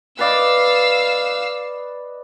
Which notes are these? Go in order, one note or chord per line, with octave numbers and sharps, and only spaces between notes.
B4 D5 D#5 F5 E6